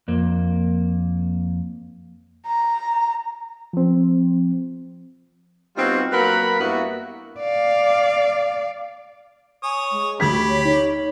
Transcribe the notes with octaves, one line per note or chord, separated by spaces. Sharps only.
F2 A#3
A#5
F3 C4
G3 B3 C4 D#4 F4 F#4
F#3 A#3 A#4 B4 F#5 B5
G2 A#3 B3 E4 F#4
D5 F5
C#5 G#5 D#6
G#3
D2 G4 B5 G#6 B6
C#5
D#4 C#5